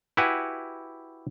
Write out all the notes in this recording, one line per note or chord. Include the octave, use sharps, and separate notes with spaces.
E4 F#4 G4 B4 F#5 G#5